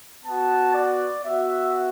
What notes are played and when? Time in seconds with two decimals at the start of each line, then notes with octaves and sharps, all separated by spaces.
0.24 B3 F#4 A5
0.74 D5
1.24 B3 F#4 E5